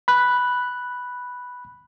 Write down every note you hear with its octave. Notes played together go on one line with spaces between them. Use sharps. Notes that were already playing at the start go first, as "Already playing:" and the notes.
B5 F#6